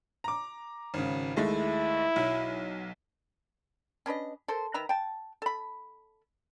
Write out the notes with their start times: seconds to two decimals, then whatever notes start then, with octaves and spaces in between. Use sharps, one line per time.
0.24 A#5 D6
0.94 G#1 C#3
1.37 D#2 G#3 A3 E4
2.16 B1 F#3
4.06 C#4 D4 B4 D#5
4.48 A4 A#4 C5
4.74 D#3 B4 E5 A#5
4.89 G5 A5
5.42 A4 B5